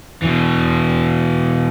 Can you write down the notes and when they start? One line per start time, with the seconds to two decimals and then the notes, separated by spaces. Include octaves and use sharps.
0.22 B2 E3